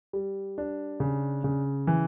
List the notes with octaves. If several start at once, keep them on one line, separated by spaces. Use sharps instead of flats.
G3
D4
C#3
C#3
E3